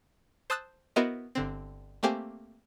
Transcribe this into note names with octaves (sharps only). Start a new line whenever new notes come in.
C5 A5 D#6 E6 F#6 A6
B3 E4 F#4 A#4 C5 D#5
G1 D3 C4
A3 A#3 C4 G4 C5 G#5